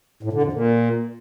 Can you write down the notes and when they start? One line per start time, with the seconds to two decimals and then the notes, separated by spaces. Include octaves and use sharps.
0.23 A2
0.33 D3
0.43 F2
0.52 A#2